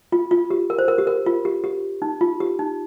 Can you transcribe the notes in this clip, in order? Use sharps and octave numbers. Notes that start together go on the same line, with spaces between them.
F4
F4
G4
A#4
C5
A#4
G4
A#4
F4
G4
G4
D#4
F4
G4
D#4